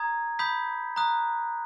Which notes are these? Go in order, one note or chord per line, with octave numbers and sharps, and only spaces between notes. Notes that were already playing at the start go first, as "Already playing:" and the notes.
Already playing: A#5 D#6 G#6
B5 D#6 G6 B6
A#5 D#6 F#6